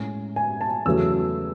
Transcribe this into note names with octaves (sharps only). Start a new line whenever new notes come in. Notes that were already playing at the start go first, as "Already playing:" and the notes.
Already playing: A2 G#3 C#4 G#5
G#5
A5
E2 C#3 F#3 A3 C#4 E6